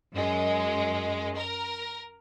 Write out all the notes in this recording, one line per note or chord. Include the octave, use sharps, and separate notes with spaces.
F#2 G#3
A#4